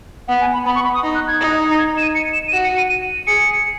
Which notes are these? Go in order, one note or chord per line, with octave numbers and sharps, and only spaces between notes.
B3 F#5
G#5
B5
B3 B5
C#6
B5
D#6
D#4
F#6
G#6
D#4
G#6
E7
D#7
C#7
E7
D#7
F#4 E7
C#7
D#7
D#7
G#4 C#7